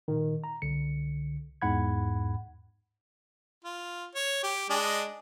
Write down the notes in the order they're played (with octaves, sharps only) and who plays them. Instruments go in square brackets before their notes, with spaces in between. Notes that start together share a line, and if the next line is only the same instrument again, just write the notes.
[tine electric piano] A#2 D#3
A#5
C2 D3 C#7
E2 G#2 F#5 B5 G#6
[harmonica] F4
C#5
G4
G#3 D4 D#5